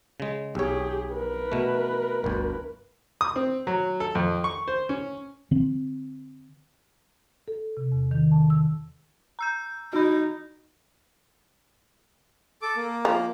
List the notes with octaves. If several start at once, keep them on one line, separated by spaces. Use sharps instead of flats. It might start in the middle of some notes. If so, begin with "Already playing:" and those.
C#3 G#3
B1 G4 G#4 C#5
A#4 B4
B2 A3
G1 D2
D#6
C4
F#3
A4
F2
C#6
C5
C#4
D3 C4
A4
C3
E2
D#3
A5
E6
A#5 E6 G6
D#4 F#4 B5
A4 D6
A#3
F3